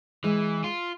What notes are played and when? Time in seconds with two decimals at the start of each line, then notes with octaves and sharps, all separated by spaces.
0.24 E3 G#3
0.64 F4